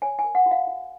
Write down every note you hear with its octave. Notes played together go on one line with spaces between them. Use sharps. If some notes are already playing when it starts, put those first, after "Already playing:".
C#5 G#5
G#5
A#4
F#5
F#4
F5
F#4